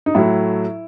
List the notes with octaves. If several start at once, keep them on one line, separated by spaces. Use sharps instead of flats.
D#4
A2 F#3 A3 E4